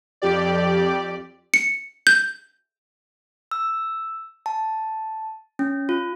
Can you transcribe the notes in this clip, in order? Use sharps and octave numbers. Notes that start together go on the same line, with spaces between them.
F2 G4 D5
C#7
G6
E6
A5
C#4
F4